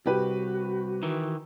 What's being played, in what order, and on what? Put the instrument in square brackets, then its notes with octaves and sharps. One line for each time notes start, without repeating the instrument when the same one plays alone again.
[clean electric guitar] C2 [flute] F#4 [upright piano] G4 B4
[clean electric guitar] D#3 E3